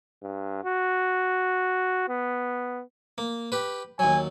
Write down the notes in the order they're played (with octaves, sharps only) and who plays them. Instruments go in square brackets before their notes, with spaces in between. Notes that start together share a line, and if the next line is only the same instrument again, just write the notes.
[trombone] G2
F#4
B3
[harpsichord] A#3
G4 B4
[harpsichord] D#2 F#3 [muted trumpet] G#5